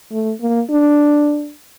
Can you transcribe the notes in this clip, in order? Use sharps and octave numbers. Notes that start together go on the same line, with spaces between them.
A3
A#3
D4